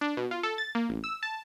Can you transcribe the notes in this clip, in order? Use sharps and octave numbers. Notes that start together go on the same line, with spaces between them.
D4
B2
F4
A4
A6
A#3
A1
E6
A5